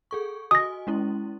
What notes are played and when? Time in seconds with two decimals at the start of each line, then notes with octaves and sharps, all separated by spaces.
0.11 G#4 A4 C#6
0.51 F#4 D#5 G#5 D#6 A#6
0.87 G#3 C#4 E4